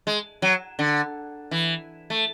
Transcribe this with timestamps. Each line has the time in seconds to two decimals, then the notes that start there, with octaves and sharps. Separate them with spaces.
0.07 G#3
0.42 F#3
0.79 D3
1.51 E3
2.10 A3